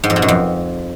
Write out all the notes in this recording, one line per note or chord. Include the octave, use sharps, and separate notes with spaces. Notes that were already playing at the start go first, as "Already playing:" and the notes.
G#2
F2
B2
F#2
F2